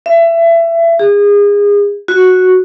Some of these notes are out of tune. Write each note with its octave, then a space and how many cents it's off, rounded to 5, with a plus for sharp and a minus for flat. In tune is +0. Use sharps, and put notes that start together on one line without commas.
E5 +25
G#4 -30
F#4 -5